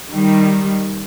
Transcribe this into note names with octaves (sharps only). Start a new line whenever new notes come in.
D#3 G3